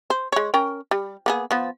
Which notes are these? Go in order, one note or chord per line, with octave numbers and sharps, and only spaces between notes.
C5
G#3 C#5
C#4 A#4 G5
G3
A#3 B3 G#4
F3 B3